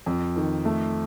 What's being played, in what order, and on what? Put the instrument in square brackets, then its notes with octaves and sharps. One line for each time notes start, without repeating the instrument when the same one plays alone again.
[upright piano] F2
D#3
A3